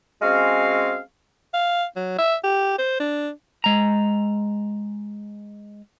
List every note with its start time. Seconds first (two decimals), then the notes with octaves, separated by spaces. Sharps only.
0.22 G#3 C4 C#4 F#4 F5
1.54 F5
1.96 F#3
2.18 E5
2.43 G4
2.78 C5
3.00 D4
3.64 G#3 A#5